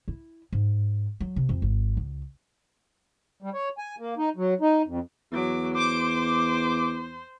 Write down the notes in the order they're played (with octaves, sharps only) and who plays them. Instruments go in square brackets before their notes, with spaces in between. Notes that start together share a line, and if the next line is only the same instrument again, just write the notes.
[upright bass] E4
G#2
F#3
C3
F2
G#1
C#2
[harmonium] G3
C#5
G#5
A#3
D#4
F#3
D#4
F2
[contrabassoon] E2 [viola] F#3 D6
[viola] C5 [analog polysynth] D6